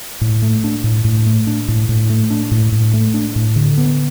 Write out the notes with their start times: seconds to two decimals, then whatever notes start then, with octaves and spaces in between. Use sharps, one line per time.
0.21 A2
0.42 A3
0.64 D4
0.84 A2
1.05 A2
1.26 A3
1.47 D4
1.68 A2
1.89 A2
2.10 A3
2.30 D4
2.51 A2
2.72 A2
2.94 A3
3.14 D4
3.36 A2
3.56 D3
3.78 B3